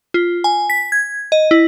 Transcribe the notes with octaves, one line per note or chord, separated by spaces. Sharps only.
F4
G#5
B6
G#6
D#5
E4